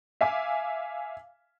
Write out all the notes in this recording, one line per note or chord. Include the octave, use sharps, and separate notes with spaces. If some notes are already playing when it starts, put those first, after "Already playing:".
E5 F5 G#5 D6